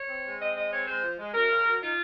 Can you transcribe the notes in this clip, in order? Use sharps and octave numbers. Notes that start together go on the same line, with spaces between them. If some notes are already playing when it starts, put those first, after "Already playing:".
Already playing: C#5
C4
G#3
C4 D#5
G#3 D#5
C4 C#5
G#3 C5
F3
G#3
F#2 A#4
C#3
F#3
D#4 F4